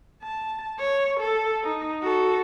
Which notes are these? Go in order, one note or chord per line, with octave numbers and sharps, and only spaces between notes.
A5
C#5
A4
D#4
F#4 A4